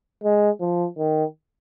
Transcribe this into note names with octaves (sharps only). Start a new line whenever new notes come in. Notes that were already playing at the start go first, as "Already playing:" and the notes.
G#3
F3
D#3